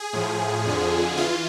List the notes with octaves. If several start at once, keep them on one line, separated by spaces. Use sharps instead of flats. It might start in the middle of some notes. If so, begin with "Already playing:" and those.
Already playing: G#4
A2 F3
F2 D3 F3
E3 F4